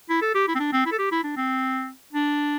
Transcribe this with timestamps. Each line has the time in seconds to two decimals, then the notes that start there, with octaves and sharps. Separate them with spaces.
0.09 E4
0.22 A4
0.35 G4
0.48 E4
0.55 C4
0.60 D4
0.73 C4
0.86 E4
0.92 A4
0.99 G4
1.12 E4
1.24 D4
1.37 C4
2.13 D4